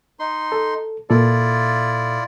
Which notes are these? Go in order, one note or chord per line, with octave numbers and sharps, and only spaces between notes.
D#4 C6
A4
A#2 E4 F4 A4 D5